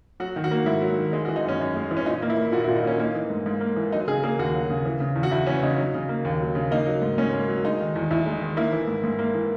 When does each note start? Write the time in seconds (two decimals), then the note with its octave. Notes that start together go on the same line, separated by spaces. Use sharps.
0.20 F#3 F#4
0.36 D#3
0.44 F#4
0.51 A#3
0.66 G#2 E4
0.82 F#3
0.98 D#3
1.13 G#3
1.25 F#4
1.29 E3
1.36 D#4
1.45 F#2 C#4
1.60 F#2
1.76 G#3
1.91 E3
1.97 C#4
2.06 A#2 D#4
2.22 A#3
2.30 E4
2.37 A#3
2.52 A#2 F#4
2.64 E4
2.68 A#2
2.76 D#4
2.83 A#3 C#4
2.99 A#3 D#4
3.15 E3
3.30 G#2
3.46 G#2
3.61 A#3
3.77 E3
3.92 F#3 D#4
4.08 C#3 G#4
4.23 A#3 G#4
4.39 D#2 F#4
4.54 F#3
4.70 C#3
4.85 E3
5.00 C#3
5.16 E2
5.23 F#4
5.31 E2 E4
5.47 E3 C#4
5.63 C#3 D#4
5.78 F#3
5.94 C#3
6.09 A#3
6.25 D#2
6.40 F#3
6.55 C#3
6.71 A#3 D#4
6.86 F#3
7.02 G#2
7.18 G#2 C#4
7.33 A#3
7.48 F#3
7.64 G#3 D#4
7.80 D#3
7.96 E2
8.11 E2 E4
8.26 G#3
8.41 D#3
8.57 A#3 E4
8.73 E3
8.87 G#2
9.04 G#2
9.19 A#3
9.34 E3